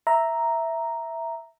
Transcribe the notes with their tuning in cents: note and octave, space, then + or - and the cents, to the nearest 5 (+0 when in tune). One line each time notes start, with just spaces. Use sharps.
E5 +0 A#5 +0